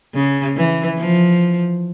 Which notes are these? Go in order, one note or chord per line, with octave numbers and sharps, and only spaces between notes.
C#3
E3
F3